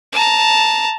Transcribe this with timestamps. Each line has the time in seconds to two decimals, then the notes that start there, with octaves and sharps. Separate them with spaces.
0.13 A5 A#5